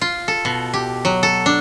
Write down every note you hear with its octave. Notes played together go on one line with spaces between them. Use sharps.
F4
A4
B2
G4
F#3
A4
D4